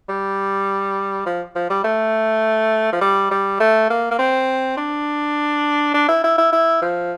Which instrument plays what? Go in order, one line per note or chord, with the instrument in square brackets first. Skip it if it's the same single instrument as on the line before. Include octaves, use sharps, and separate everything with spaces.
[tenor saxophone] G3
F3
F3
G3
A3
F3
G3
G3
A3
A#3
A#3
C4
D4
D4
E4
E4
E4
E4
F3